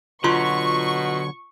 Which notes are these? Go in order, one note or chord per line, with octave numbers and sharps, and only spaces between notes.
B2 D3 F#3 F4 C6 C#6